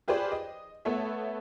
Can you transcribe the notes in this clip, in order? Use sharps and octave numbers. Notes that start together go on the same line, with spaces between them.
F4 G4 G#4 B4 C5 D5
D#5
A3 B3 A4 C#5 E5